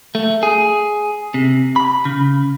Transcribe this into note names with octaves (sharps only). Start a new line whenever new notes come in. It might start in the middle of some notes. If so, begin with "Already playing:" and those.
A3
G#4
C3
B5
C#3